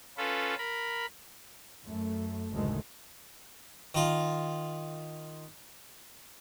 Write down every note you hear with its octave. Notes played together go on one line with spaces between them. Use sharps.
C#4 F4 A4 B4
A#4 B5
F#2 A3
F#1 D2 A2 D#3 G#3 A3
D#3 F4